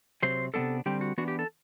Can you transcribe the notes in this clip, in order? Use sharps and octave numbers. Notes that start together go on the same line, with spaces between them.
C3 F#3 C4 C5
C3 G3 B3 D4 A4
D3 G3 C4 G4
F#4
E3 B3 D4 F#4
G4
A4